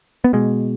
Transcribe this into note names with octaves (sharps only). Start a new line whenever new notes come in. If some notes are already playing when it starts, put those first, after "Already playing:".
B3
B2 G#3